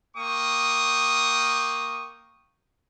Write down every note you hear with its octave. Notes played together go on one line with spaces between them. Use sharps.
A#3 G5 C#6 D#6